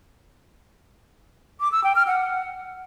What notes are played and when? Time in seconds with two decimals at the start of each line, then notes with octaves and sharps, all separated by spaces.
1.60 D6
1.72 E6
1.84 G5
1.95 F6
2.07 F#5